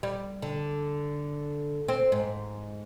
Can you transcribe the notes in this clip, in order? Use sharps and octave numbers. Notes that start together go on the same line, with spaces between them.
G3
D3
C4
G#2